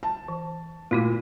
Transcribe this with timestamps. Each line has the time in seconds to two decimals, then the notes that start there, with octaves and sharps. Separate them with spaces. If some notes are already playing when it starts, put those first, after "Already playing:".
0.03 A5
0.28 E3
0.91 A#2 A3 E4 F#4